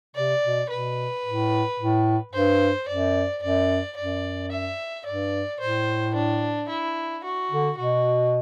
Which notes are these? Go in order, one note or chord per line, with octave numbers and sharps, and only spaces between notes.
C3 D5
B2
B2 B4
A2
A2
G2 C5
F#2 D5
F#2 D5
F#2 D5
E5
G2 D5
A2 C5
D4
E4
F#4
D3
B2 F#4